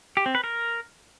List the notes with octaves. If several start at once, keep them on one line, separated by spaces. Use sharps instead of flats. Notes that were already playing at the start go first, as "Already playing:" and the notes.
G4
C4
B4
A#4